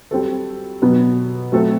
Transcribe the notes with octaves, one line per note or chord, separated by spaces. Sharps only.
G3 C4 F#4 A4
B2 F#3 B3
F#3 A3 C4 F#4 A4